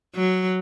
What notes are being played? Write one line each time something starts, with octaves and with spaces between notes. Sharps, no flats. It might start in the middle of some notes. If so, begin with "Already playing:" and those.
F#3